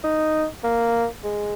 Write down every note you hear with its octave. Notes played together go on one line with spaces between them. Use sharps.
D#4
A#3
G#3